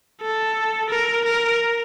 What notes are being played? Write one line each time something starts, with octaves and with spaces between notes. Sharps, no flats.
A4
A#4
A#4